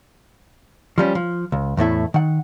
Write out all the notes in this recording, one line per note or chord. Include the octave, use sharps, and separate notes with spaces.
F3 G3 C#4
F3
C#2
E2 A2 A3 E4
D#3 F#5